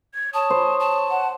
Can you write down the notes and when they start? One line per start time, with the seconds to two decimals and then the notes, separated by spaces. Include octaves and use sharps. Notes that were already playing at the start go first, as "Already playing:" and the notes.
0.15 G#6
0.34 C#5 A5 D#6
0.50 C5
0.80 A5
1.11 F#5